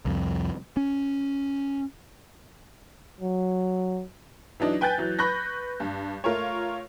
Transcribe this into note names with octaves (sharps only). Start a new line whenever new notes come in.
C2 F2
C#4
F#3
E3 F#3 D4 D#4
B4 G5 G#5 F#6 G6 A6
E3 F#3
B4 B5 C#6 F#6 G6 A#6
G2
A3 F4 A#4 C#5